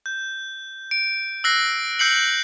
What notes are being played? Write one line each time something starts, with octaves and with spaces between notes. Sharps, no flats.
G6
D7
E6 F#6 A#6 C7
E6 G6 C7 C#7 F#7